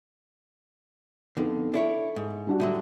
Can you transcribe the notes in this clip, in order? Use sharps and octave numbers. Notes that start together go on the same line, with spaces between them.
F2 D3 B3 D#4 A4
D4 E4 A4 C#5
G#2
G3 D4 F#4
A2 D3 F#3